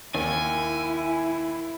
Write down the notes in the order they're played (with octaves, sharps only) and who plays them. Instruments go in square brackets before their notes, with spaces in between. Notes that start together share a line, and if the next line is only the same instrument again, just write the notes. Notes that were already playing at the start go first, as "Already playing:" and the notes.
[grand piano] D#2 [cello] E4 [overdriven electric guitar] G#5